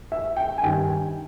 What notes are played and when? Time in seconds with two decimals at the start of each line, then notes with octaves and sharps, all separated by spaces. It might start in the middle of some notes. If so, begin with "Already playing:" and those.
0.12 E5
0.37 G5
0.58 G#5
0.63 G2 D#3 G5